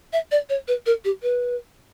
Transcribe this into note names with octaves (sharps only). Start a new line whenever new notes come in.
E5
D5
C#5
B4
A#4
G4
B4